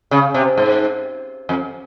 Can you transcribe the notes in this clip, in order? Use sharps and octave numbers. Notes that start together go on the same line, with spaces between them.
C#3
C3
G#2
F2